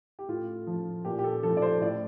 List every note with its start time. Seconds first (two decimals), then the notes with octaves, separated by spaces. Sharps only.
0.19 G4
0.29 A2 F4
0.67 F3
1.05 A#2 G4
1.19 G4
1.24 A4
1.43 F3 A4
1.57 D5
1.62 C5
1.81 A2 D5